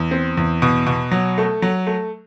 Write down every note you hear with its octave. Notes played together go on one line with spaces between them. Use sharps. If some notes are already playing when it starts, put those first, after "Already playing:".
Already playing: E2
C4
E2
B2
B2
F#3
A3
F#3
A3